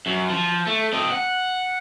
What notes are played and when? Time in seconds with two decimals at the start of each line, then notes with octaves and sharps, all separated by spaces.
0.06 F#2
0.30 F3
0.67 A3
0.92 C4 D#5
1.11 F#5